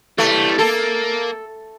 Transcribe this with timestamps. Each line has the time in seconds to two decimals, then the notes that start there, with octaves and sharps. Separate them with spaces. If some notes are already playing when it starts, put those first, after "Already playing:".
0.18 E3 G3 A3
0.59 A#3 A4